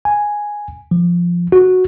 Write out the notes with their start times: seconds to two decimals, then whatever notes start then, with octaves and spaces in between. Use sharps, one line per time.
0.05 G#5
0.91 F3
1.52 F#4